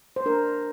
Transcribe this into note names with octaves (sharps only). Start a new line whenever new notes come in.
C5
D4 A#4